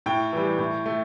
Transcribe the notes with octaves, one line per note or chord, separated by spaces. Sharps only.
A2 G5
E3 G3
A2
A3